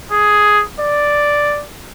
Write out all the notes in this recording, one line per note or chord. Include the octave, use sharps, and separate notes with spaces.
G#4
D5